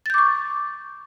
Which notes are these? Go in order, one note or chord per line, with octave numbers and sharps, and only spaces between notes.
C#6 D6 G6 A6